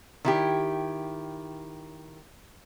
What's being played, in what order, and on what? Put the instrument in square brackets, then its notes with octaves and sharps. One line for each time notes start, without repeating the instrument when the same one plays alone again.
[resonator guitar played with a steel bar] D#3 E4 G4